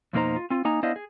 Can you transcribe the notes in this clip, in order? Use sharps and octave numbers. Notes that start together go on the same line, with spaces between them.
F2 B2 A#3 D#4 C5 A#5
F4
C4 F4
A#3 D#4 G#5 A#5
B3 D4 E4 C5 D#5 F5
G#4